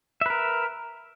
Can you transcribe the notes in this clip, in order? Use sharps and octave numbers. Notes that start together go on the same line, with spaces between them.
A#4 B4 E5